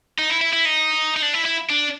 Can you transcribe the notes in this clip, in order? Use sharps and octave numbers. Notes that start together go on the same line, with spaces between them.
D#4
E4
E4
E4
D#4
D#4
D4
E4
E4
D4